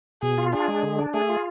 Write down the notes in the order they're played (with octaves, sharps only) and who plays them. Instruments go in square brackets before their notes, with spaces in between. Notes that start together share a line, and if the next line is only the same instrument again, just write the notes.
[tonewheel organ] B2 [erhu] G#4
[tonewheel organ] F4
[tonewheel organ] D4 [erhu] G#4
[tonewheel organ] G#3
D3
D4
[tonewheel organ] A3 [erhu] G#4
[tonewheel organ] F4